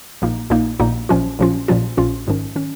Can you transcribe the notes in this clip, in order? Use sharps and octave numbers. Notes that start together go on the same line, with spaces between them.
A#1 A#2 A#3 D#4
A#1 A#2 A#3 D#4
A#1 A#2 A#3 D#4
A#1 A#2 F3 C#4 F4
A#1 A#2 F3 C#4 F4
A#1 A#2 F3 C#4 F4
A#1 A#2 F3 C#4 F4
G#1 G#2 D#3 C#4
D#3 C#4